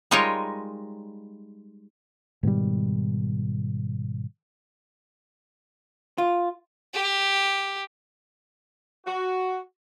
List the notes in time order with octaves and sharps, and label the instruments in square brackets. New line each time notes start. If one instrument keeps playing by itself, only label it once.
[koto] G3 G#3 D#4 F4 A#4 C#5
[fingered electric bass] G#2 B2 D#3 G3
[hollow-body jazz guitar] F4
[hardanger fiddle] G4
[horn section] F#4